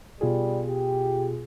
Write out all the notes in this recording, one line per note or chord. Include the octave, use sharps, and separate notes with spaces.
B2 G3 F4 G#4
G4